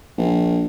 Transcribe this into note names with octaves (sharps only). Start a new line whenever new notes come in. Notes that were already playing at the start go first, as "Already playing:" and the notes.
A#1